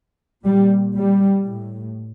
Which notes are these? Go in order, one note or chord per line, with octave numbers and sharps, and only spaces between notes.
A#2 G3
G3
A2